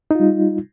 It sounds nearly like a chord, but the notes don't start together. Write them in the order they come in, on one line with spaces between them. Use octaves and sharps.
D#4 F4 G3